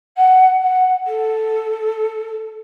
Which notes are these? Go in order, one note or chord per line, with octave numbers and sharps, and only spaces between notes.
F#5
F#5
A4